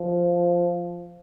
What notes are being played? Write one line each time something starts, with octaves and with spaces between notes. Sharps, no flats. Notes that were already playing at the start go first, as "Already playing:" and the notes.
Already playing: F3